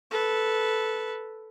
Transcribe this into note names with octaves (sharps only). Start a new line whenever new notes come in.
A4 B4